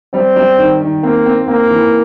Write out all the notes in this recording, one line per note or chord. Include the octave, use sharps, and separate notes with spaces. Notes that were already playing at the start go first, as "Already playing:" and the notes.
G3 C4
G3
D#3
D#3
A#3 C4
C4
A#3 C4
E3